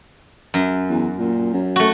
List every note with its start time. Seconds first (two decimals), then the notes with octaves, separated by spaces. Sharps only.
0.54 F#2
0.89 E2
1.18 A#2
1.53 F#2
1.76 A3 F#4